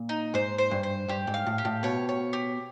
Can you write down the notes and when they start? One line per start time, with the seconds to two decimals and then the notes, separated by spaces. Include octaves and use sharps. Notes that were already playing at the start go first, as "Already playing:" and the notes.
Already playing: A#2
0.09 D#4
0.34 G#2 C5
0.58 C5
0.71 G2
0.83 C5
1.08 G2 G4
1.27 G#2
1.34 F5
1.46 A2
1.58 G4
1.65 A2
1.83 B2 C#5
2.09 C#5
2.33 G4